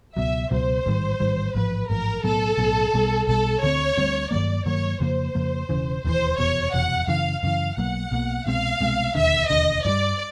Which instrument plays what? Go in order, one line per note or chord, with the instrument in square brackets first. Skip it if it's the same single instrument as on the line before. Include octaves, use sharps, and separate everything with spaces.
[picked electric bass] C#2 B2 F#3 [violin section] E5
[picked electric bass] C#2 B2 F#3 [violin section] C5
[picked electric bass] A1 G#2 D#3 G3
A1 G#2 D#3 G3
[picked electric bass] A1 G#2 F3 [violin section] B4
[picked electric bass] A1 G#2 F3 [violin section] A#4
[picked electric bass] B1 A2 F#3 B3 [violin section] A4
[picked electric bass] B1 A2 F#3 B3
B1 B2 G3
[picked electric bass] B1 B2 G3 [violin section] A4
[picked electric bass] D2 D3 G3 C4 [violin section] C#5
[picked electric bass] D2 D3 G3 C4
[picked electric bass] G2 D#3 F#3 A#3 [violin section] D5
[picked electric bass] G2 D#3 F#3 A#3 [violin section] C#5
[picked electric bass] F2 C#3 F3 A#3 [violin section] C5
[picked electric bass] F2 C#3 F3 A#3
E1 D#2 C#3 E3
[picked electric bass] E1 D#2 C#3 E3 [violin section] C5
[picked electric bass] F1 E2 B2 [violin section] C#5
[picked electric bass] F1 E2 B2 [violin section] F#5
[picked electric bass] F#2 C#3 E3 [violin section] F5
[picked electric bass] F#2 C#3 E3 [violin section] F5
[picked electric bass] B1 B2 F#3 A#3 [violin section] F#5
[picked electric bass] B1 B2 F#3 A#3
[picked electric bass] C2 B2 G#3 C4 [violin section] F5
[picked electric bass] C2 B2 G#3 C4
[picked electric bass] E1 D#2 D3 [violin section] E5
[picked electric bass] E1 D#2 D3 [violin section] D#5
[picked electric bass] G2 E3 G3 [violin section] D5